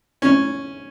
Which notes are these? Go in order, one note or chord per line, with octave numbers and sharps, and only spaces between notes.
C#4